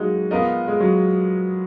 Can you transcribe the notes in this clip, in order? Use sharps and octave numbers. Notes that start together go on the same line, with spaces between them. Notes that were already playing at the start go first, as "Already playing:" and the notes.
Already playing: F#3 G#3 A#3 D#4 F#4
B3 F4 A#4 D#5
G#3
F#3